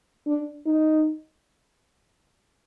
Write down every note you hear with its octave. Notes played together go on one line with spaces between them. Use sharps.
D4
D#4